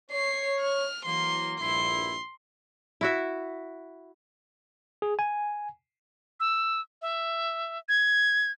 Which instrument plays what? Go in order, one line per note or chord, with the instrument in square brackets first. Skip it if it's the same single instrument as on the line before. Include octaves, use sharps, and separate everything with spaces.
[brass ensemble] C#5 [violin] C7
[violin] F6
[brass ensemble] E3 F#3 A#3 [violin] C6
[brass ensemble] A#1 G2 E4 [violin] C6
[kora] E4 F#4 E5
[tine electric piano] G#4
G#5
[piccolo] E6
E5
G#6